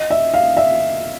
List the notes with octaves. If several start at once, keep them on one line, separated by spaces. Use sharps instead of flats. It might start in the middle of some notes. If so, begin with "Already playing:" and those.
Already playing: D#5
E5
F5
E5